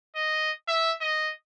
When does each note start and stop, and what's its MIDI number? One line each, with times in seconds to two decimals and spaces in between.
0.16 0.51 75
0.68 0.93 76
1.01 1.32 75